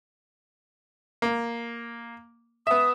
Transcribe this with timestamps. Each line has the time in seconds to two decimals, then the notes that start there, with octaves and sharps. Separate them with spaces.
1.22 A#3
2.67 B3 E5 D#6